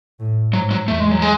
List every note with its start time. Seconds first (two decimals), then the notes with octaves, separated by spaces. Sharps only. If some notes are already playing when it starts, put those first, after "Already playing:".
0.20 A2
0.53 G#2 F#3
0.71 F#3
0.88 E2 A3
1.00 G#3
1.11 F#3
1.22 G#3